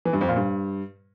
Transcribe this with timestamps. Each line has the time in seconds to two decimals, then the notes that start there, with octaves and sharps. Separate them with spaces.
0.05 E3
0.13 G2
0.21 F2
0.29 A#2
0.36 G2